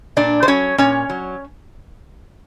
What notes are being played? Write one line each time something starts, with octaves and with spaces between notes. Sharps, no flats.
A#2 D4 D5
C5
F#3 C#4 C#5
A#2 C#4 C#5
F#3